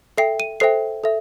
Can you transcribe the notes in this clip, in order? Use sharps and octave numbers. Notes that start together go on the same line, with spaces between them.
A4 E5 G5 C7
D#7
A4 C5 E5 G5 C7
A4 E5